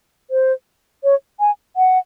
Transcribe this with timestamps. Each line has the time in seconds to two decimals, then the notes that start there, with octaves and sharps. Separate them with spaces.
0.31 C5
1.04 C#5
1.40 G#5
1.77 F#5